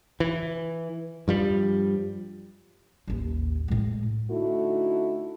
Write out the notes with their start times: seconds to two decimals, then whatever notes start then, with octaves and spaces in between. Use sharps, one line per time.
0.20 E3
1.28 G2 F3 G3
3.08 A1 D#2
3.68 A2 G#3
4.30 D3 A3 D#4 E4 F#4